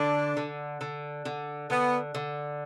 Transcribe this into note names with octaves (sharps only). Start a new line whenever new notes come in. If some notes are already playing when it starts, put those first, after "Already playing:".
Already playing: D3 D4
D3
D3
D3
D3 B3
D3